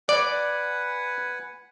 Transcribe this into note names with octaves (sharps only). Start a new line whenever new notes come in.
B4 D5 F#5 G#5